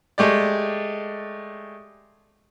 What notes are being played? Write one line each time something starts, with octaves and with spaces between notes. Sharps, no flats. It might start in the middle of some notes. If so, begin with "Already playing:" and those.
G#3 A3 G4 D5